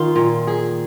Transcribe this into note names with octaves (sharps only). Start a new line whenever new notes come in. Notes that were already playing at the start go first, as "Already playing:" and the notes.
Already playing: D#3 F4
A#2
G#4